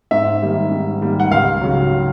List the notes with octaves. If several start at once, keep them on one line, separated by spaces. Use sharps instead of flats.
G#2 E5
D#3 G3 A#3
G#2
D#3 G3 A#3
F#5
C#2 F5
C#3 F#3